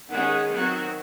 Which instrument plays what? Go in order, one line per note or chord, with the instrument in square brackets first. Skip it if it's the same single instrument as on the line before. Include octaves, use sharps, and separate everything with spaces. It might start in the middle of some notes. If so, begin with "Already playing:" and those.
[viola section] D#3 G#3 C#4 G#4 [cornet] F#5
[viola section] D#3 F#3 C4 F#4